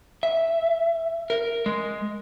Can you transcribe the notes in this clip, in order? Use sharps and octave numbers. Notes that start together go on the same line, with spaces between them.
E5
A#4
G#3